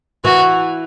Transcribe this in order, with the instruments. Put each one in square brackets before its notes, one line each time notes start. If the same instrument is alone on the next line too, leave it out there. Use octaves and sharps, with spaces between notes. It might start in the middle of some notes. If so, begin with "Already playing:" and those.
[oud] E3 [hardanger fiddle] F#4